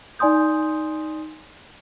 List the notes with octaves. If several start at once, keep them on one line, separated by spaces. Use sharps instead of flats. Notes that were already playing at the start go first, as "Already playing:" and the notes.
D#4 D5 G#5 C6 D#6 G6